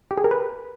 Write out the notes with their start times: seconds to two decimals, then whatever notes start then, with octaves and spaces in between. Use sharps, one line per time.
0.11 G4
0.18 G#4
0.24 A#4
0.31 B4